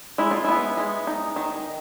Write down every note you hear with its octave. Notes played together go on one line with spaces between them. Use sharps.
G#3 E4
F4
B3 E4
G#3
D#4
D#3